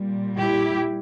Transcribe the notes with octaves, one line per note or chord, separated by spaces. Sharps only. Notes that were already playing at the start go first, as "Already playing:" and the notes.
Already playing: A#2 G3
E4 G4